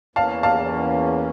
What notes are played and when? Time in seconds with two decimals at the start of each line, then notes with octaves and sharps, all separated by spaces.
0.16 E2 E3 A#3 C#4 F5 A5
0.43 F5 A5